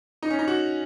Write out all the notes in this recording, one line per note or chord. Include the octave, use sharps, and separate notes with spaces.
D#4
C#4
D#4
F#4